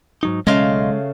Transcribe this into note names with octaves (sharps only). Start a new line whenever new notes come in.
G#2 F#3 D#4
B1 C#3 G#3 A3 D#5 F5 C6